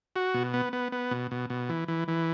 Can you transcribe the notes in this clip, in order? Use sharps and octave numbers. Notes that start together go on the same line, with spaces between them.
F#4
B2
B3
B3
B3
B2
B2
B2
E3
E3
E3